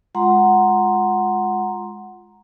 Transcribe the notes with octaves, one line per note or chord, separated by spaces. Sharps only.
G#3 F4 F#5 A#5 C6